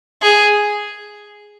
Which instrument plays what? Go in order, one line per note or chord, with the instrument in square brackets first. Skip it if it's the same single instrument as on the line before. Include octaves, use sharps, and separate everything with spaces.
[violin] G#4